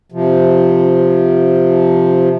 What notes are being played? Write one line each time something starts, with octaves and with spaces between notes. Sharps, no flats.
C3 F3